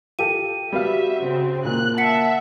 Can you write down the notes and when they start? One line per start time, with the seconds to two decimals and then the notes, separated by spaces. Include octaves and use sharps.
0.19 F4 G4 A4 D#7
0.73 G3 B3 F#4 E5 F5
1.23 C#3 C4
1.65 A#2 A#3 F#6
1.98 E5 F#5 A5 B6 C#7